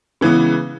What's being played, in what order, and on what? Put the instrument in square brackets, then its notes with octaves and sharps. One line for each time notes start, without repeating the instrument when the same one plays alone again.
[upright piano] C#3 E3 G#3 B3